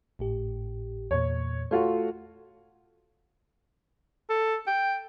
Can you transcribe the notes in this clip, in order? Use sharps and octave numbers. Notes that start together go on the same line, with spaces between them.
G#1 A2 G4
E2 A#2 C#5
A3 F4 F#4 C#5
A4
G5